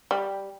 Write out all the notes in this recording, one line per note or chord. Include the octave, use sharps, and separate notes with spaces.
G3